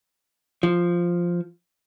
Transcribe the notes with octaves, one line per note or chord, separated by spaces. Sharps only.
F3